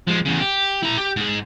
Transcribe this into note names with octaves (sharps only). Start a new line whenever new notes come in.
F3 G#3
E2 C#3
G4
E4 A#5
G4
G#2 G#3